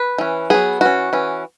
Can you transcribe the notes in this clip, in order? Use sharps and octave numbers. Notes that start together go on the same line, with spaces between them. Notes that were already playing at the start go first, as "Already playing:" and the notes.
Already playing: B4
E3 C#4
F#3 B3 G#4
E3 C#4 F#4
E3 C#4